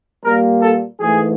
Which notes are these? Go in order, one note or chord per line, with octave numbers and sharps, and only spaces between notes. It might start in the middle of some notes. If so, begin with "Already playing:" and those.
A#2 G3 A#3 A#4
A4
G#2 E3 A3 G#4